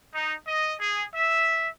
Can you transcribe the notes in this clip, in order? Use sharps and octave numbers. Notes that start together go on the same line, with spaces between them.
D#4
D#5
G#4
E5